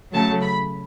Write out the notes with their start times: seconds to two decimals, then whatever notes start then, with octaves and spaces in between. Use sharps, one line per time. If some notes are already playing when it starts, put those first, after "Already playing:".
0.13 C#3 F#3 A3 A5
0.42 B5